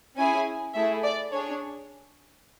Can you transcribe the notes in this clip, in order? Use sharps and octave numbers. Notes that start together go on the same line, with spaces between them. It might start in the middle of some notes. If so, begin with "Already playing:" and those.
C#4 E4 G#4 G#5
A3 E4 G#4 E5
D5
D4 G#4 C#5